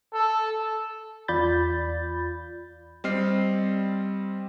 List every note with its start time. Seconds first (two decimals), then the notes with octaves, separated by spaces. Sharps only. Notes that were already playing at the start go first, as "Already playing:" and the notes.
0.13 A4
1.28 E2 F4 D5 B5 G6 A6
3.04 G3 C4 D#5 F6 C7